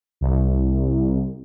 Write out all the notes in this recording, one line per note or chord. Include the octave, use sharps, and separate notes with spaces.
C2